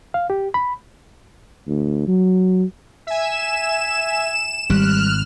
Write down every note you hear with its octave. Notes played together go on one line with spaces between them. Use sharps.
F5
G4
B5
D2
F#3
E5 G#5 E7
G#1 G3 F6 F#6